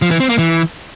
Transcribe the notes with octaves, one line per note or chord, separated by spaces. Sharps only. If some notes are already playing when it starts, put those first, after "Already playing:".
F3
E3
C4
A#3
E3